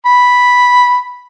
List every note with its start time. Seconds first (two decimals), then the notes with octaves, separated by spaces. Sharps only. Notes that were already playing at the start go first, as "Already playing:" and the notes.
0.06 B5